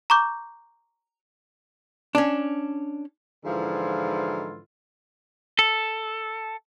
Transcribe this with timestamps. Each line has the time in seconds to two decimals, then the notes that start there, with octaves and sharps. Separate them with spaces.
0.10 A#5 C#6 D6 G6
2.15 C#4 D4
3.45 G#2 D3 E3 F3 E4 F4
5.59 A4